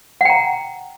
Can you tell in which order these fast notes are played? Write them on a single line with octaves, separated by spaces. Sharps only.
F#5 G5 A#5